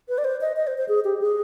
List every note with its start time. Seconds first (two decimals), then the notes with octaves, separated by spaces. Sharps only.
0.09 B4
0.18 D5
0.24 C5
0.41 D#5
0.56 D#5
0.67 C5
0.78 C5
0.89 G#4
1.05 G4
1.21 G#4